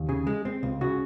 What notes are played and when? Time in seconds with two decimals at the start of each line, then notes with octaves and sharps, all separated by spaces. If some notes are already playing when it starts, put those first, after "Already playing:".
Already playing: D#2
0.09 C#3 G#4
0.27 G#3
0.45 C4
0.63 C#2
0.81 C#3 F#4